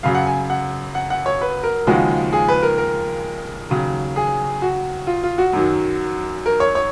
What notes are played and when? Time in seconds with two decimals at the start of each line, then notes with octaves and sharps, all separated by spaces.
0.03 F#2 C#3 F#3 F5
0.15 F#5
0.27 G#5
0.50 F#5
0.95 F#5
1.10 F#5
1.26 C#5
1.41 B4
1.63 A#4
1.87 D#2 C#3 F3 G#3 F#4
2.33 G#4
2.48 B4
2.63 A#4
2.78 A#4
3.70 D#2 C#3 F#3
4.16 G#4
4.62 F#4
5.07 F4
5.24 F4
5.38 F#4
5.53 F#2 D#3 F#3
6.46 A#4
6.60 C#5
6.75 C#5